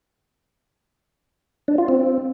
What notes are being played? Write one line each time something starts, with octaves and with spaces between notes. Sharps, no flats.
D4
F4
C4